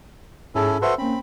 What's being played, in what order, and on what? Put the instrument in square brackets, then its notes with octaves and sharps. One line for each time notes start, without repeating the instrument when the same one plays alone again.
[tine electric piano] G#2 G#4 A5 [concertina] C#4 E4 A4
[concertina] F#4 A4 C5 [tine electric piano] B4 E5
[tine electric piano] A#3 C#4 [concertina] C4 B5